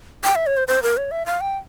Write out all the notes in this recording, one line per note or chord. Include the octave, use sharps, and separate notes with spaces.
G5
E5
C#5
C5
C5
A#4
C#5
E5
F5
G5